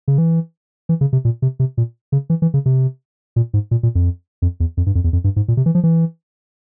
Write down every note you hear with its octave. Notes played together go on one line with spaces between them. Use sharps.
C#3
E3
E3
C#3
C3
A#2
C3
C3
A#2
C#3
E3
E3
C#3
C3
A#2
G#2
A#2
A#2
F2
F2
E2
F2
G2
F2
E2
F2
G2
G#2
A#2
C3
E3
F3
E3